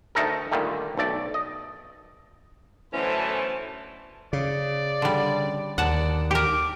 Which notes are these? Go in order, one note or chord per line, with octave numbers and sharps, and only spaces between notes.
D2 A3 D#4 A4 A#4
A#2 D3 D#3 G3 A3
B1 A3 D5
D#5
F#2 B2 D3 E3 A3 C#4 C5 A5
C#3 D5
D3 G3
D#2 D5 F#5 A5
G4 A#4 D6